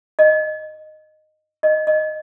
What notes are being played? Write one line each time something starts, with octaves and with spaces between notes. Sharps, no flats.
D#5
D#5
D#5